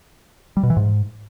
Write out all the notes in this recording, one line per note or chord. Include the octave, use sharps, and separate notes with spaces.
G3
B2
E3
G#2